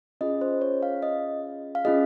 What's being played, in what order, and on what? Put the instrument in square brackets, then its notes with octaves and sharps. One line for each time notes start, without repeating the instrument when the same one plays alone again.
[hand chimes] C#4 F4 G#4 D#5
C5
C#5
F5
D#5
F5
C#4 F4 G#4 D#5